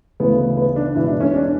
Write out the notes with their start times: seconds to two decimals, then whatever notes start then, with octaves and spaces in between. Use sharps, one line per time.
0.20 D2 C#3 E3 B3
0.57 B3
0.76 D4
0.96 E1 E2 B2 E4
1.08 D4
1.20 C#4
1.34 D4